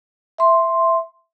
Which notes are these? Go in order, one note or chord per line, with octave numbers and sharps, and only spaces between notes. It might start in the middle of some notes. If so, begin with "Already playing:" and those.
E5 C6